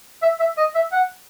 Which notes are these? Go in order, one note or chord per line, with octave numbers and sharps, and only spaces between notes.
E5
E5
D#5
E5
F#5